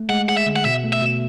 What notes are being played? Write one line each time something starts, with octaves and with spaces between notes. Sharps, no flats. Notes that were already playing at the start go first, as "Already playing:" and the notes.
Already playing: A3
G#3 F#5
G#4 F#5
E5
D3
F#5
B2 E5
A3
E5
B2